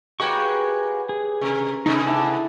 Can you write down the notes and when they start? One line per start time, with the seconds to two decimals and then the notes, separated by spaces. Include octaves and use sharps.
0.20 G#3 A#3 F#4 G4 B4 C#5 G5 C#6
1.09 G#4
1.41 C3 A#4 A#5 C#6
1.86 C3 G#3 B3 D#4
2.07 D4 E4 A4 F#5 A5